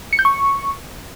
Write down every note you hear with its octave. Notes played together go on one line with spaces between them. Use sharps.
C#7
G6
C#6